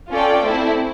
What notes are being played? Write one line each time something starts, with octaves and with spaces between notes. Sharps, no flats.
C#4 F4 A4 D5 G5
A3 C4 E4